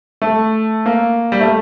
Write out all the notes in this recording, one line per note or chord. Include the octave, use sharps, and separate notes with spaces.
A3
A#3
G3
A3